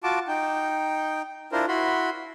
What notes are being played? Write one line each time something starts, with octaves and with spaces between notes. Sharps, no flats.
F4 F#4 A5 D6
D#4 G5
D4 E4 F4 A#4 C5
E4 F#4 B5 C6